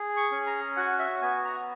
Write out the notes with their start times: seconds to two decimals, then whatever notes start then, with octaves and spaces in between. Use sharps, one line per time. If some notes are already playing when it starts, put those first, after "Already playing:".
Already playing: G#4
0.17 C#6
0.32 C#4
0.47 A#5
0.77 F#4 F#5
0.99 E5
1.22 B3 G#5
1.45 A#5